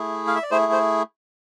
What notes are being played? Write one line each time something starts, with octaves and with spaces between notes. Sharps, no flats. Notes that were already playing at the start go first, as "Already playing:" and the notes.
Already playing: A3 E4 G#4
F5
E5
D5
A3 E4 G#4 C5
C5